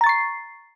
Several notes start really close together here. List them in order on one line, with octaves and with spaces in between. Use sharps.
A#5 A6 C#6 C7